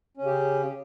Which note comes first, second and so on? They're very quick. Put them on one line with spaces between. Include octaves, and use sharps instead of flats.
C#4 C#3 G4